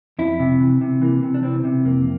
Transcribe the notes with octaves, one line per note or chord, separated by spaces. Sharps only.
F2 E4
C3
E3
C3
E3 A#3
C3
D4
E3 C4
C3
F2 A#3